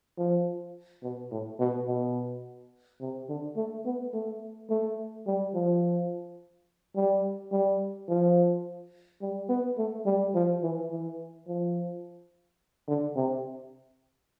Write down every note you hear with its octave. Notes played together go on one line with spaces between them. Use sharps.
F3
B2
A2
B2
B2
C3
D3
A3
B3
A3
A3
G3
F3
G3
G3
F3
G3
B3
A3
G3
F3
E3
E3
F3
D3
C3